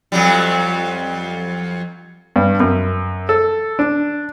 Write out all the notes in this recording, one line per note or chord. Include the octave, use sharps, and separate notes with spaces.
F2 F#3 G3
G2
F#2
A4
D4